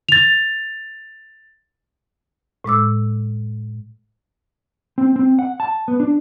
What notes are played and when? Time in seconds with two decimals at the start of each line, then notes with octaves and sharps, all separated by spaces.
0.09 A6 F7
2.64 A2 G#3 D6 E6
4.98 C4
5.16 C4
5.39 F#5
5.60 A5
5.88 B3
6.00 D4